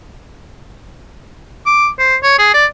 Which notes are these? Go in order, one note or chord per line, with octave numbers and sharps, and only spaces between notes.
D6
C5
C#5
G#4
D5